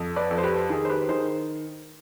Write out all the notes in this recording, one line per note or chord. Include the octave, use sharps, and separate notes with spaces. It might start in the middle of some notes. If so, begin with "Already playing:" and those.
Already playing: F2
B4 D5
F2
C5
G4 B4
D#3 G#4
C5
G4 B4
D#3 G#4 C5